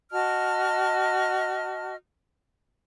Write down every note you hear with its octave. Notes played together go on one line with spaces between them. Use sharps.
F#4 D#5 A5 F6